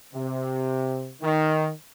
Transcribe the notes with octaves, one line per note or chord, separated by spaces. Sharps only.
C3
D#3